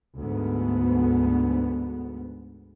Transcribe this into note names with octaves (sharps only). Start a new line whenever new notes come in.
D2 G#2 B3